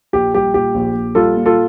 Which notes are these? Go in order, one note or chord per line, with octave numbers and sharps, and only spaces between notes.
A#1 G4
G3 G4
A#2 G4
A#1
A#1
G3 F4 A4
A#2
F4 A4